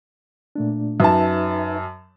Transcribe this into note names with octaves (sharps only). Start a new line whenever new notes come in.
A#2 A3 D4
F#2 D#4 B4 E5 A5